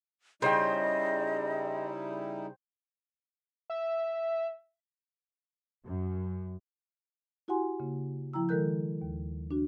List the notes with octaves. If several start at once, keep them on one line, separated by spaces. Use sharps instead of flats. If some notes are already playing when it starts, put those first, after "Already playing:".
C#3 G3 D#4 E4 C5 D#5 G5
E5
F#2
E4 F#4 G4 F#5 G#5 C6
C#3 A#3
F3 E4 G5 A#5 E6
D#3 G#3 A4 A#4 F#6 G6
D#2
D4 F#4